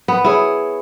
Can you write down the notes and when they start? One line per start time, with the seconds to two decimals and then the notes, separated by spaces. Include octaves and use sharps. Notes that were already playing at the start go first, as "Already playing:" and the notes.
0.08 B3
0.24 E4 G#4 C#5